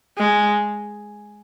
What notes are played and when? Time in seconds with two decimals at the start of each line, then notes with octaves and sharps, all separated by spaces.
0.18 G#3